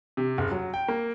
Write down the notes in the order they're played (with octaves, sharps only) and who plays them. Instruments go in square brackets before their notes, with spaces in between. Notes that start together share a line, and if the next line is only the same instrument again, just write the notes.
[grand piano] C3
F#1
F#3
G5
A#3